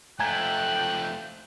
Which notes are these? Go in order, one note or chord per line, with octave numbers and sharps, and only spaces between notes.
F3 A3 G5 G#5 A#5 F#6 G#6